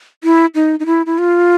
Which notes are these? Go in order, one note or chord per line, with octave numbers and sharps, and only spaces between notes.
E4
D#4
D#4
E4
E4
F4